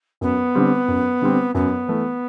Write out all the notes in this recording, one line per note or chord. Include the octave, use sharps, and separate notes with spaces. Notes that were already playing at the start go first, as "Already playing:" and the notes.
F#2 B3
D3 G3 C4
F#2
D3 G3 C4
F#2 B3
E3 A3